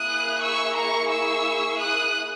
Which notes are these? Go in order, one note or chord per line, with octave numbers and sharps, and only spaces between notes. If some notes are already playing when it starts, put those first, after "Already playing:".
Already playing: A#3 E4 G#4 D#6 F#6
C#6 E6
A#5 C#6
C#6 E6
D#6 F#6